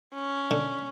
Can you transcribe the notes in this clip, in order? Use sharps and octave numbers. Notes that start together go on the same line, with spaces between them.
C#4
D3